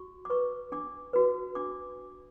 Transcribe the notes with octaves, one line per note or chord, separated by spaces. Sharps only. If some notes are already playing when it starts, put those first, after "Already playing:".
Already playing: F#4 C#6
D6
B4 C#6
D4 D6
F#4 B4
D4 D6